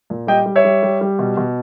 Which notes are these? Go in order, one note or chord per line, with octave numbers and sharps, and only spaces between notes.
A#2
G3 D#5 G5
G3
C#5 E5
G3
G3
G3
B2
B2